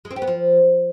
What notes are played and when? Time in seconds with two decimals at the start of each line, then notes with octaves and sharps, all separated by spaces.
0.05 G#3
0.11 C4
0.16 G4
0.22 B3
0.27 F3